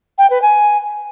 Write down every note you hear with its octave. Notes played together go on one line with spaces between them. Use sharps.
G5
B4
G#5